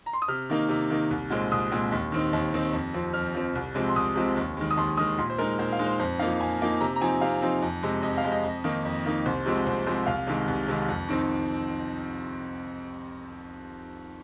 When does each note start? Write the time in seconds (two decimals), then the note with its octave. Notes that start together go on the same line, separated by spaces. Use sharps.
0.06 A#5
0.13 C6
0.22 D#6
0.28 C3 F6
0.50 D#3 A#3 D#4
0.69 C3
0.90 D#3 A#3 D#4
1.11 C2
1.30 A#2 G#3 C4
1.52 C2 D#6
1.72 A#2 G#3 C4
1.92 D#2
2.12 D#3 C4 D#4
2.33 D#2
2.53 D#3 C4 D#4
2.73 F2
2.94 F3 C4
3.14 F2 F6
3.34 F3 C4
3.55 C2
3.75 C3 F3 G#3 C4
3.88 C6
3.95 C2 D#6
4.15 C3 F3 G#3 C4
4.37 D#2
4.57 D#3 G#3
4.71 D#6
4.77 D#2 C6
4.97 D#3 G#3 D#6
5.18 A#2 C6
5.30 C5
5.38 G#3 D#4 A#4
5.59 A#2 C5
5.73 F5
5.79 G#3 D#4
5.86 C5
5.99 F2 C5
6.19 D#4 F5
6.22 F3 A#3
6.41 F2 G#5
6.61 F3 A#3 D#4
6.80 C3 A#5
6.96 A#5
7.01 F3 C4 D#4 G#5
7.21 C3 F5
7.42 F3 C4 D#4
7.62 F2
7.83 C3 G#3
8.03 F2 D#5
8.18 F5
8.24 C3 G#3
8.32 D#5
8.44 F2
8.64 D#3 A#3 D#4
8.85 F2
9.05 D#3 A#3 D#4
9.26 C2 C5
9.46 C3 F3 G#3 C4
9.66 C2 C5
9.86 C3 F3 G#3 C4 C5
10.06 C2 F5
10.27 C3 D#3 G#3
10.48 C2
10.68 C3 D#3 G#3
10.89 F2
11.09 D#3 C4 D#4